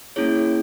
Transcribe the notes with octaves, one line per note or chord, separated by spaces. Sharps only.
A#3 C#4 E4 G#4 C#5